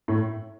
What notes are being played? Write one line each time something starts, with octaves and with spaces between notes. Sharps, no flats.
A2